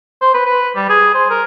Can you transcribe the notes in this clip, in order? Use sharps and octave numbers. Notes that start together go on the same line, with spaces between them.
C5
B4
B4
G3
G#4
C5
A#4